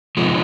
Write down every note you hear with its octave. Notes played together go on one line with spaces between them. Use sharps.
C3 F3 G#3